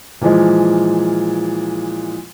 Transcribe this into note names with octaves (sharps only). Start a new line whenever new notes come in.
A#2 E3 F3 G#3